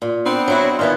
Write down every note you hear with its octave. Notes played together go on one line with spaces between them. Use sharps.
A#2
B3 C4 D4
F#3 E4 F#4
A#2 D#3 E3 B3 F4 D#5